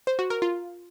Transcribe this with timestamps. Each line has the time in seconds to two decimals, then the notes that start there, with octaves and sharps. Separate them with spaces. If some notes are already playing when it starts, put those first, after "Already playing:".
0.07 C5
0.19 F#4
0.30 A#4
0.42 F4